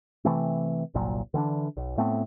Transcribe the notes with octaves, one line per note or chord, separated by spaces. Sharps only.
C3 E3 A3 C4
G1 C2 A#2 F#3
D3 E3 C#4 D4
B1
A2 A3 B3 C4